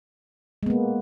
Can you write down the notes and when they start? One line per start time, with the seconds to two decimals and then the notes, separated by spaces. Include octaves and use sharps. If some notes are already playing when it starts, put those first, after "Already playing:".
0.63 G#3
0.66 B3
0.70 A#3